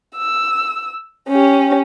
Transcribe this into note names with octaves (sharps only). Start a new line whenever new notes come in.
E6
C#4 G4